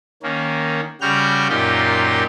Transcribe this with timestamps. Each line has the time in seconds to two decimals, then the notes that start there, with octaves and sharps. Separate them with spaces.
0.23 D#3 A#3 C#4
1.01 C#3 G3 F#4 F6 G6
1.49 F#2 A#2 D#4 F4 G4 C6